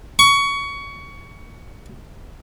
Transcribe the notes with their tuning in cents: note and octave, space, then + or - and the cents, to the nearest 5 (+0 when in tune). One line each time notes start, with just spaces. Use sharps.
C#6 +20